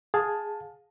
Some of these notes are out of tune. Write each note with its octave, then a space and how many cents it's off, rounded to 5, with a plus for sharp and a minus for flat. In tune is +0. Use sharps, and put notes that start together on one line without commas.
G#4 +0 F5 +25 A5 +0